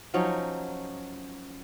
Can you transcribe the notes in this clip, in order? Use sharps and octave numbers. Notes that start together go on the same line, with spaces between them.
F3 F#3 C#4 D#4